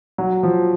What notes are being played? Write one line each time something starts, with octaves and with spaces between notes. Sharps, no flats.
F#3
F3